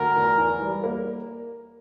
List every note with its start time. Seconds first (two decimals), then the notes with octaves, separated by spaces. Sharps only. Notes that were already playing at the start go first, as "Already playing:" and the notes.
Already playing: D2 A#4
0.16 E2
0.38 E2
0.61 G3
0.84 A#3